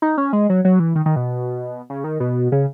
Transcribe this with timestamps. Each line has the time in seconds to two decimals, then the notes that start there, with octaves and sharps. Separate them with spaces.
0.02 D#4
0.18 C#4
0.33 G#3
0.49 F#3
0.65 F#3
0.80 E3
0.95 D#3
1.06 D#3
1.16 B2
1.90 C#3
2.04 D#3
2.20 B2
2.52 C#3